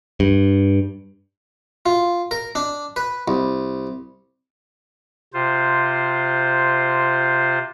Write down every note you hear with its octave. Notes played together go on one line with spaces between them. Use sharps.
G2
F4
A#4
D4
B4
C2
C3 F4 C5